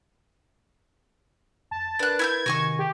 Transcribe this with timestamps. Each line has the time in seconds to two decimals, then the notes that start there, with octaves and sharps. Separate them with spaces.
1.71 F2 A5
1.99 D4 A#4 B4 F#6 A6
2.19 E4 E6 G6 G#6
2.46 C3 D#3 F#4 G#5 C#6
2.79 G4